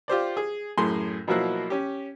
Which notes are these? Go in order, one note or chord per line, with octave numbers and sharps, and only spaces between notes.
F4 G4 C5 D5
G#4
F#2 A2 G#4 C6
B2 F3 F#3 A#3 E4 F#6
C#4 G4